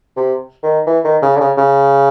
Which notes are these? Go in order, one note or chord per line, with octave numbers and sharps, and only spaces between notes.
C3
D#3
E3
D#3
C#3
D3
C#3
C#3